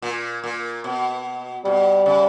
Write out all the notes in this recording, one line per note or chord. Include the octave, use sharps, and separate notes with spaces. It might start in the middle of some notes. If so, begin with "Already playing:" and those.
A#2
A#2
B2
B2 G3
C#3